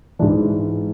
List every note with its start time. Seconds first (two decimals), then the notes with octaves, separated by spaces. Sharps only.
0.19 E3 D4
0.22 G#2